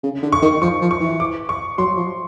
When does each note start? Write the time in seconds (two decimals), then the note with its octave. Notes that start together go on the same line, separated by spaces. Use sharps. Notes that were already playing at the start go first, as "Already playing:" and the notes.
0.03 C#3
0.22 D3
0.32 C#6
0.42 D#3
0.62 F3 C#6
0.81 F3
0.91 C#6
1.01 E3
1.20 D6
1.49 C#6
1.78 F#3 C6
1.97 F3